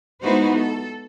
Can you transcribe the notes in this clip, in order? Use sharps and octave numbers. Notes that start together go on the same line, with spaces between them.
G#3 B3 D#4 E4 F#4 C5
A4